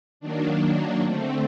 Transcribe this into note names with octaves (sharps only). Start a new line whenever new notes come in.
D#3 F#3 A#3 D4
D3 A3 C4